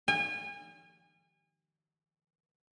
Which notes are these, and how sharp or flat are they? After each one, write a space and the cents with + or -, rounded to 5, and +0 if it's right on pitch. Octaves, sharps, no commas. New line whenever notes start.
G#5 -35